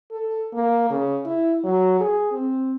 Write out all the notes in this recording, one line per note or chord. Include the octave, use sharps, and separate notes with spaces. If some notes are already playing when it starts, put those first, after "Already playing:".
A4
A#3
C#3
E4
F#3
G#4
C4